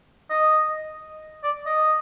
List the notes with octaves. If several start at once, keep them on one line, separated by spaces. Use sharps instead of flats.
D#5
D5
D#5